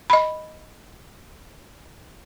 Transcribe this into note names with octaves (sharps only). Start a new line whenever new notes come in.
D#5 B5